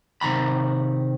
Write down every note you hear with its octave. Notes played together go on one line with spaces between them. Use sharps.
C3 D#3 A#5 B5